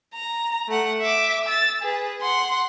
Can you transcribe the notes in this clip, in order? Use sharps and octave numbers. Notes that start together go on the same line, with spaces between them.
A#5
A3 F#5
E5 D6
E6 A6
G#4 B4
F#5 C6